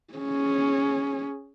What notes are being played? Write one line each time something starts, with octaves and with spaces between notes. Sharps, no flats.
C#4 G#4